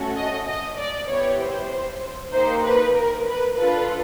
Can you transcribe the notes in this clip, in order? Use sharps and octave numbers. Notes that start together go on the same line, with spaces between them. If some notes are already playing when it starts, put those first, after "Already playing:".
Already playing: A3 C#4 F#4 A4
D#5
D#5
D5
B3 E4 G4 C#5
C5
A#3 D#4 G4 C5
B4
A#4
B4
D4 F4 A4 B4